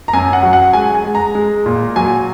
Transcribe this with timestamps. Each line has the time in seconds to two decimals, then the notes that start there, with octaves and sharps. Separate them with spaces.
0.08 A#5
0.13 F#2 G#5
0.33 F#5
0.43 F#3
0.53 F#5
0.73 G#3 G#5
0.95 G#5
1.04 G#3
1.15 A#5
1.35 G#3
1.66 A#2
1.96 F#3 G#5